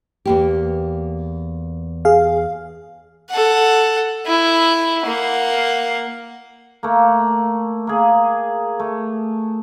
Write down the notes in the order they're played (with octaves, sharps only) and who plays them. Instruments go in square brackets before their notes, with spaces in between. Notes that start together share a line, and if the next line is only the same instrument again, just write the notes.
[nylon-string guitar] E2 A#3 G4
[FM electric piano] G#4 F5
[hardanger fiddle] A4 F#5
E4
A#3 F#5
[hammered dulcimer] A3 A#3
A#3 G#4
A3